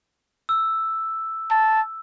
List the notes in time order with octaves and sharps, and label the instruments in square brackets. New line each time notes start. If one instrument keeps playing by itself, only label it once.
[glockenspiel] E6
[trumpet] A5